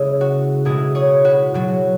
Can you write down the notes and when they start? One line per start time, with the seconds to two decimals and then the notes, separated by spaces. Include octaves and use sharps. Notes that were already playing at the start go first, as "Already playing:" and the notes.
Already playing: C#3 G#3 E4 G#4
0.21 F#4
0.65 B2 G#3 E4 G#4
0.95 G#4 C#5
1.25 F#4 B4
1.54 B2 F#3 F#4